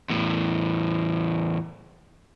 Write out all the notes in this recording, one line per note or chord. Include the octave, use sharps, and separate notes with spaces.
E2 A2